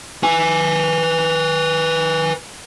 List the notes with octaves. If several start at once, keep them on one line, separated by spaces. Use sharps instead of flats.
B4 G#5